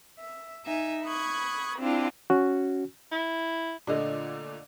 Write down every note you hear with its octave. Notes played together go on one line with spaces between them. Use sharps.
E5
D#4 E5 G#5
B5 C#6 D#6 F#6 G#6
C4 D4 E4 F4 G4
C#4 F#4
E4
A#2 D3 A3 D4 D#5